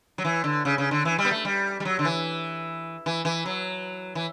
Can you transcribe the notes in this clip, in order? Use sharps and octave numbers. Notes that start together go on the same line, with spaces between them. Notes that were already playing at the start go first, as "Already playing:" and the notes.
F#3
E3
D3
C#3
C#3
D3
E3
G3
B3
A3
G3
G3
F#3
D3
E3
E3
E3
F#3
E3